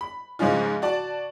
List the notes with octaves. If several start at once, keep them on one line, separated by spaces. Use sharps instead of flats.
B5
G#2 C#3 F3 G#3 C#4 F4
F#4 D5 A5